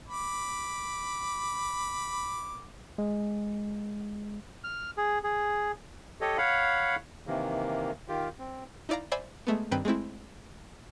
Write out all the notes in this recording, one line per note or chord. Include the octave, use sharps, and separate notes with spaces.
B5 D6
G#3
F6
G#4
G#4
G4 A4 C#5 D#5
C#5 F5 F#5 B5
C3 D#3 E3 A#3
D#3 F4 G4
C4
D#4 E4 D5 F5 A#5
C5 D5 E5 G#5 B5
G#3 A3 B3
G2 D#3 C4 B4 G5 B5
G#3 A3 C4 E4